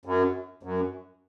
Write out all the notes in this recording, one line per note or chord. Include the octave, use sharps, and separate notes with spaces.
F#2
F#2